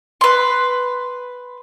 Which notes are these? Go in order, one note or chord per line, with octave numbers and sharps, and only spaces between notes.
B4 C6